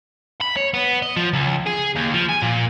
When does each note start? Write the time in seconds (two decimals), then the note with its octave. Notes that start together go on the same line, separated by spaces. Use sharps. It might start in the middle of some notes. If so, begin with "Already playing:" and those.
0.41 B5
0.57 C#5
0.74 B3
1.03 D#5
1.17 F3
1.33 C#2
1.66 G#4
1.95 D#2
2.14 F3
2.29 G#5
2.43 A#2